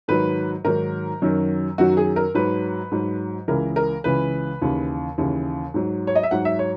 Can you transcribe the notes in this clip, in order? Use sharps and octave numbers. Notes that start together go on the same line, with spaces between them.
G#2 D#3 F#3 B4
G#2 D#3 F#3 A#4
F#2 D#3 F#3
F#2 D#3 F#3 F#4
G#4
A#4
G#2 F#3 B4
G#2 F#3
C#2 C#3 E3 A#4
A#4
C#2 C#3 E3 B4
D#2 C#3 E3
D#2 C#3 E3
G#2 F#3
C#5
D#5
E5
G#2 F#3 F#5
E5
C#5